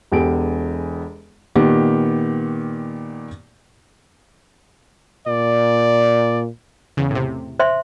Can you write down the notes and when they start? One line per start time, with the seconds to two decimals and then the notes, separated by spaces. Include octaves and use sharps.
0.12 E1 E2 G4 A4 D7
1.55 A#2 D#3 B3 G4
5.27 A#2 D5
6.97 E2 C#3
7.11 A2 C3
7.59 C5 E5 C6